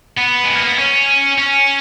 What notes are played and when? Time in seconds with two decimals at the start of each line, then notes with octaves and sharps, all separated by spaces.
0.18 B3
0.44 G#3
0.55 A#3
0.67 B3
0.79 C#4
1.38 C#4